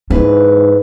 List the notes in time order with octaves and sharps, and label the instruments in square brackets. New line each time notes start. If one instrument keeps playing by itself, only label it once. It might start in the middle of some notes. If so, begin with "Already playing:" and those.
[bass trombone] G#2 [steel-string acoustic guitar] E3 B4 [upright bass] D4